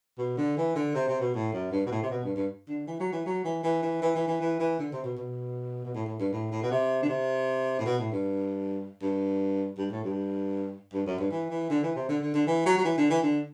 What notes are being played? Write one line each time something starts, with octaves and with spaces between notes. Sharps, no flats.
B2
D3
E3
D3
C3
C3
B2
A2
F#2
G2
B2
A2
C3
B2
G2
G2
D3
E3
F#3
E3
F#3
E3
E3
E3
E3
E3
E3
E3
E3
D3
C3
B2
B2
B2
A2
A2
G2
A2
A2
B2
C3
D3
C3
A2
B2
A2
G2
G2
G2
A2
G2
G2
F#2
G2
E3
E3
D3
E3
C3
D3
D3
D3
E3
F#3
F#3
E3
D3
E3
D3